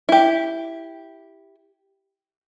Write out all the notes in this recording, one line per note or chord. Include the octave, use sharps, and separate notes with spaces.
E4 G4